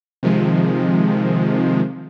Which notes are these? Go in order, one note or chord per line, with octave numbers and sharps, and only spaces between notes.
C3 D#3 F3 G#3